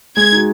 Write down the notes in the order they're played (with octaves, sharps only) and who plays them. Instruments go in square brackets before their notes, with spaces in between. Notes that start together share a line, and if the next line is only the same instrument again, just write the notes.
[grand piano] G#3 [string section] G#6
[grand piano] D#4 F#4